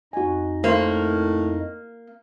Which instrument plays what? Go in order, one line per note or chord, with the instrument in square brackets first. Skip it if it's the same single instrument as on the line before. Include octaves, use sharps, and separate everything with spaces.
[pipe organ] F2 D#4 D#5 [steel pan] F#4 G#5
[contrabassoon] A2 [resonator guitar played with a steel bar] A#3 [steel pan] E4 C5